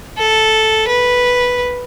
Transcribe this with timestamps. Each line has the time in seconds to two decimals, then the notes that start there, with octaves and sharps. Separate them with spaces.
0.18 A4
0.88 B4